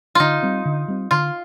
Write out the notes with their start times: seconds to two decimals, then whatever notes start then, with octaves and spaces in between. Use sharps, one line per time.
0.15 D3 D#4 F4
0.43 G3 C4
0.65 D3
0.88 G3 C4
1.11 D3 F4